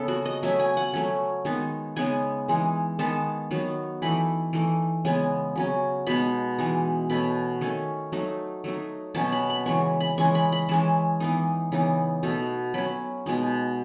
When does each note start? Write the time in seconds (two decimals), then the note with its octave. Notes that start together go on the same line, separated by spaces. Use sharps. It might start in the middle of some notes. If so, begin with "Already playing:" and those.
Already playing: C#3 B3 A4
0.08 F#4
0.25 D#5
0.43 F#3 A3 C#4 E5
0.59 G#5
0.77 F#5
0.93 F#3 A3 C#4
1.45 D#3 G#3 B3 D#4
1.96 C#3 G#3 B3 D#4 G#5
2.48 E3 G#3 D#4
2.99 D#3 G#3 B3 D#4 A5
3.51 D#3 F#3 B3
4.02 E3 A3 D#4 B5
4.53 E3 A3 D#4
5.05 C#3 G#3 B3 G#5
5.56 C#3 F#3 C#4
6.07 B2 G#3 B3 D#4 B5
6.58 E3 G#3 D#4
7.10 B2 A3 C#4 B5
7.61 D#3 A3 C#4
8.12 F#3 A3 D#4
8.64 F#3 A3 D#4
9.15 B2 F#3 C#4 A5
9.32 B5
9.50 B5
9.66 C#3 E3 G#3 C#6
10.00 B5
10.18 E3 G#3 C#4 C#6
10.35 B5
10.52 B5
10.69 E3 G#3 C#4 A5
11.20 E3 B3 D#4
11.72 C#3 E3 B3 D#4
12.23 B2 A3 D#4
12.74 F#3 C#4 B5
13.26 B2 G#3 D#4